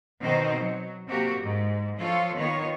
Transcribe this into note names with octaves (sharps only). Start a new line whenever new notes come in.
B2 D#3 C4 D#4 C5
F#3
C3 A#3 F#4 G4
G#2
F3 F4 A4 C#5
D#3 B3 F4 C#5